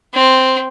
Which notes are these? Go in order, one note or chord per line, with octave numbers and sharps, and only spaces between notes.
C4